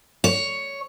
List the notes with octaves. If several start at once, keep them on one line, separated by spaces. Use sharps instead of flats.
C#5